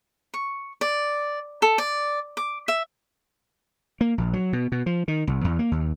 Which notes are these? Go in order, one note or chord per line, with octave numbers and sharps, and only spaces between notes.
C#6
D5
A4
D5
D6
E5
A#3
A#1
F#3
B2
B2
F3
D#3
C2
E2
A#3
D#2